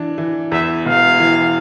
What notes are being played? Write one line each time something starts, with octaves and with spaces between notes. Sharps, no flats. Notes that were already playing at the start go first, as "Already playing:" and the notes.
Already playing: E3 D4
E3
E2 E5
E1 F5
E3